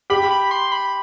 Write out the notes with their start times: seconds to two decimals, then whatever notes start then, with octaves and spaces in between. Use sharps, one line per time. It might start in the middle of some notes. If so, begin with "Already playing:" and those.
0.10 G4 B5
0.31 B5
0.51 C6
0.72 B5